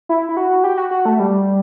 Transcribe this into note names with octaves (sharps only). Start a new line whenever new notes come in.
E4
E4
F#4
G4
F#4
F#4
A3
G3